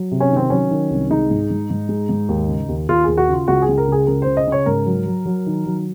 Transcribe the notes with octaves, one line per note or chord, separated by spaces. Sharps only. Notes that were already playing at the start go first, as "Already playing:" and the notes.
Already playing: F#3
C3
C#4
D#3
C4
F#3 C#4
D#3
C2
G#3 D#4
G#2
G#2
G#2
G#3
G#2
D#2
C#3
D#2
D#2 F4
D#2 G#4
F#4
C#3 F4
C#2 F#4
G#4
C#2
A#4
C#3 G#4
C#2 A#4
C#3 C5
D#5
C#3 C#5
G#2 A#4
F#3
F#3
F#3
D#3
F#3